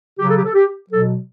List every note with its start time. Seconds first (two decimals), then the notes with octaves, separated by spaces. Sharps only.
0.19 C#3 F#3 G4
0.28 A4
0.36 G4
0.45 A4
0.53 G4
0.90 B2 F#3 A4